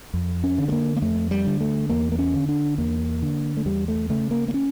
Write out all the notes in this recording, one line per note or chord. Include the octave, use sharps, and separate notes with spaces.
F2
C#4
D3
A3
A#3
A#3
F2 A3
G3
D3
A3
E2 A#3
A#3
C#4
D3
D4
E2 A#3
D3
A3
E2 G3
A3
C#3 A3
A#3
A#3
C#4